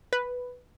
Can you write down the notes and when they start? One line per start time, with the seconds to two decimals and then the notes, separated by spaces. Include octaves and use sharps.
0.13 B4